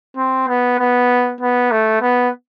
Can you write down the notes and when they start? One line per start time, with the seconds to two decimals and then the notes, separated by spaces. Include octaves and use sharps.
0.17 C4
0.48 B3
0.79 B3
1.41 B3
1.71 A3
2.01 B3